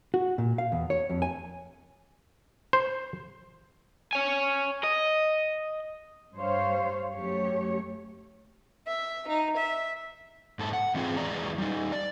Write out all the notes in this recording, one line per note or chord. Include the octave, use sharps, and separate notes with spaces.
F#4
A#2
F5
E2
C#5
F2
G#5
C5
C#5 G#5
D#5
G2 G3 C5 C#5 F5
F#2 A3 G4 C#5
E5
D#4
E5
G#2 A4
F#5
G#2 E3 C4 F4 G#4 G5
E2 G#3 E4 D5 A#5
G3 D#4
D5